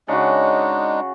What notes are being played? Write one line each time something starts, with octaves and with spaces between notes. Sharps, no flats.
C#3 G#3 D4 D#4 F#4